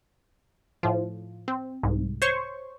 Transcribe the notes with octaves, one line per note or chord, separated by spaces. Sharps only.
A2 F3
C4
C2 G#2
C5 C#5 C#6